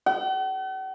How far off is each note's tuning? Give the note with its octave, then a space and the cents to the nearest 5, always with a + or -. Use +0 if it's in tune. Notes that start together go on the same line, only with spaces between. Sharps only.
F#5 +45